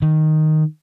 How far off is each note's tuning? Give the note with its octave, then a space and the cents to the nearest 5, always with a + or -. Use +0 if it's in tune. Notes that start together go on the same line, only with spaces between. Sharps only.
D#3 -5